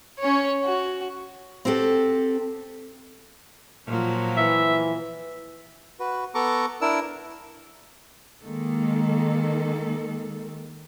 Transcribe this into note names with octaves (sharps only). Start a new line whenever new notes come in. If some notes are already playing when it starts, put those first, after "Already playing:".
C#4 C#5
F#4
C4 F#4 G4 A4
A#2 F3 F#3
E3 E5
F#4 B4
B3 A4 A#5 C#6 D6
D4 E4 A#4 A5 E6
D#3 G#3 A#3 A4